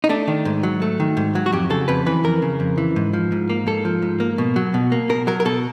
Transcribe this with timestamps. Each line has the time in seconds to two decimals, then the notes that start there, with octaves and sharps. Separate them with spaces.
0.04 D#4
0.09 A3 D4
0.28 D#3
0.45 G#2
0.63 F#3
0.82 A3
1.00 D#3
1.17 G#2
1.35 F#3
1.46 F#4
1.52 F2 G4
1.70 C#3 A4
1.88 F2 B4
2.06 E3 B4
2.24 F2 A#4
2.42 C#3
2.60 F2
2.78 E3
2.96 G#2
3.13 F3
3.32 G#2
3.50 A#3
3.67 G#2 A4
3.85 F3
4.02 G#2
4.20 A#3
4.38 B2
4.56 F#3
4.74 B2
4.92 A#3
5.09 B2 A#4
5.27 F#3 A#4
5.40 A#4
5.45 B2 A4